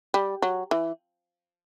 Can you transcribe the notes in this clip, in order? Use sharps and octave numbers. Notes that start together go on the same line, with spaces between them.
G3
F#3
E3